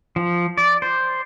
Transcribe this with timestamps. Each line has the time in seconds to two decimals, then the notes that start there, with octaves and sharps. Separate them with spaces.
0.16 F3
0.58 D5
0.82 C5